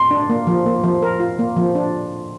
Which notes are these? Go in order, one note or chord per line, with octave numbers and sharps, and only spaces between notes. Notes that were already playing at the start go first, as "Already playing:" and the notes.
Already playing: C6
D4
A#3
F3
A#3
F3
A#4
F4
A#3
F3
D4